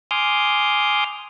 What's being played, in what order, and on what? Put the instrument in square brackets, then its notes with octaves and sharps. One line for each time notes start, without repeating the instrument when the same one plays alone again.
[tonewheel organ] G#5 C6 D6 D#6 F6 G6